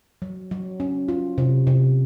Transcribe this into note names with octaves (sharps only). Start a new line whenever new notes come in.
F#3
F#3
C#4
F4
C3
C3